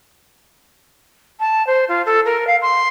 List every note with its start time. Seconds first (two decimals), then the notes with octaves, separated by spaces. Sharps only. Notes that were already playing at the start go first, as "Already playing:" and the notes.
1.39 A5
1.66 C5
1.88 F4
2.06 A4
2.25 A#4
2.47 F5
2.61 C6